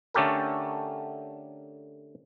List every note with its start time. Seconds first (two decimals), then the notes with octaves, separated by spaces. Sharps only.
0.14 D3 A3 C#4 G4 A4 A#4